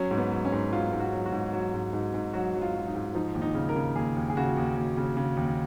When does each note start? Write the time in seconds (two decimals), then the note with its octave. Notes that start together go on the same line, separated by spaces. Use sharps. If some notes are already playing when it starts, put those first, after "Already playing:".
Already playing: F#3 C#4
0.11 G#2
0.18 B3
0.31 F#3
0.45 C#4
0.52 G#2
0.73 F#3 F4
0.92 G#2
1.00 F#4
1.13 F#3
1.26 F#4
1.32 G#2
1.53 F#3
1.74 G#2
1.93 G#2
2.14 G#2
2.33 F#3 F#4
2.54 F#3
2.62 F4
2.75 F#3
2.87 D#4
2.95 G#2
3.15 F3 D#4
3.35 D#2
3.42 D#4
3.55 C#3
3.69 A#4
3.76 C#3
3.96 D#2 G#4
4.16 D#2
4.30 G#4
4.37 C#3 F#4
4.57 D#2
4.77 D#2
4.97 C#3
5.17 C#3
5.37 D#2